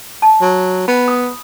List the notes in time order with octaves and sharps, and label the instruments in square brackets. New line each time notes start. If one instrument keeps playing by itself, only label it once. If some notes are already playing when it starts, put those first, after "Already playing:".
[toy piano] A5
[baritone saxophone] F#3
[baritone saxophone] B3 [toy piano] B5
[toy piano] D#6